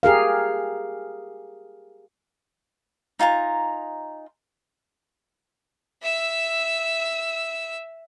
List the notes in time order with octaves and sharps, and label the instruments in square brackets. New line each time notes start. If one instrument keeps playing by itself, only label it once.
[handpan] G4 G#4 A#4 F5
[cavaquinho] D#4 F4 G#5 A#5
[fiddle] E5 E6